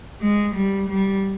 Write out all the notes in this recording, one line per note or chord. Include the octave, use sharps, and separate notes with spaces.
G#3
G3
G3